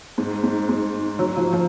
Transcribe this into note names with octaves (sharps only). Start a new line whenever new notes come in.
G#2
G#2
G#2
F#3
F3
F3